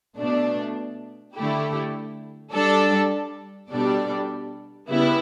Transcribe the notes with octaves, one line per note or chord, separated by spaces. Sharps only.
B2 A3 D4
D3 A3 E4 G4
G3 D4 A4
B2 G3 D4 A4 D5
C#3 G3 B3 E4